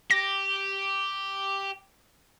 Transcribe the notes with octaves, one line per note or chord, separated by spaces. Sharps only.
G4 A#6